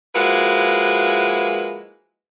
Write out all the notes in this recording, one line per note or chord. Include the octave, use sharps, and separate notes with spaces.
F3 G#3 A#3 E4 F#4 B4